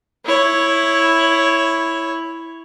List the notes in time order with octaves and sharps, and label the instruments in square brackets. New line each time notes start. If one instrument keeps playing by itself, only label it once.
[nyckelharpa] E4 C#5